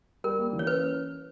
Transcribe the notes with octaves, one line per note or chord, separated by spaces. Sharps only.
G3 A#4
A#3
E3
C#5
C#4 B4